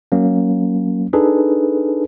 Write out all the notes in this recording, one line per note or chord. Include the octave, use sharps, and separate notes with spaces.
F#3 A#3 C#4
D4 D#4 G#4 A4 B4